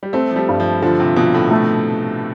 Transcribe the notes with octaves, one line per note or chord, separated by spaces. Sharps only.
G3
A3 C4
F3
G3
G2
F3
D3 F3
C3
B2 F3
A2
A3